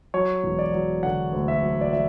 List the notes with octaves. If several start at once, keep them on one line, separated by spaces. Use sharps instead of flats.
F#3 C#5
E1
D5
F#3
D3 F#5
D2
E5
F#3
D5
F#3 E5